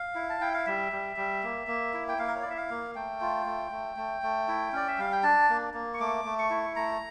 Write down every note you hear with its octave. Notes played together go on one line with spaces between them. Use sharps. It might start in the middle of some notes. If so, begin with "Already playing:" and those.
Already playing: F5
E4
A5
E4 G5
F5
G3 E5
G3
G3
A#3
A#3
E4
G5
A#3 F5
A#4
C#5
E4 D5
E5
F5
A#3
A3 G5
F4
A3
A3
A3
A3
E4
C#4 D5
E5
G3 F5
G5
D4 A5
A#3
A#3
C#6
A3 D6
A3
C#6
E4
A3 A#5